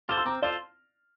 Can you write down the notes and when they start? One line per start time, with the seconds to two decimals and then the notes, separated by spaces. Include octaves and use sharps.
0.09 F4 A4 C5 D6 F6
0.17 C6 E6
0.25 C4 A#5 D6
0.42 F4 A4 C5 D5 F5